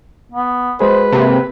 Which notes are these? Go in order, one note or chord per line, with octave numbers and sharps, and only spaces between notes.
B3
G#3 F#4 G#4 B4 C5
C3 A#3